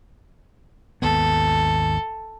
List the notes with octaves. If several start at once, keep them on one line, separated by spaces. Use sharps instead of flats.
G#1 D#2 B3 A4